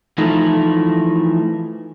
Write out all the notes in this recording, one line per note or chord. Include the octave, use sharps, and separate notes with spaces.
E3 F3 A3 D#4 E4